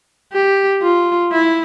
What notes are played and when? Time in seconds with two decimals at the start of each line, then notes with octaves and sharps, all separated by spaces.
0.33 G4
0.82 F4
1.32 E4